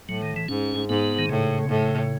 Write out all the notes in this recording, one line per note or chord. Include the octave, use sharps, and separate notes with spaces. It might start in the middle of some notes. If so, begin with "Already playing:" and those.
A2 F#3
D#3
E3
G#2 C#4
G#2 B3
D#3
A2 C#3
A2